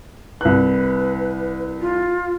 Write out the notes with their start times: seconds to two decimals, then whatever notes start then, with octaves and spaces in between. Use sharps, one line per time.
0.41 C2 B4 F#6
1.80 F4